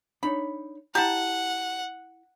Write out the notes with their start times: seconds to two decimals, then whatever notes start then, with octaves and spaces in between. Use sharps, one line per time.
0.23 D4 D#4 C#5 B5
0.95 E4 G4 F#5 A5 A#5